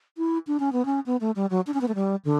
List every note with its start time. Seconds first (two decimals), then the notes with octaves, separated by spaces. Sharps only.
0.18 E4
0.47 D4
0.60 C#4
0.73 B3
0.85 C#4
1.06 B3
1.21 A3
1.36 G3
1.50 F#3
1.67 D4
1.74 C#4
1.81 B3
1.88 A3
1.95 G3
2.25 D3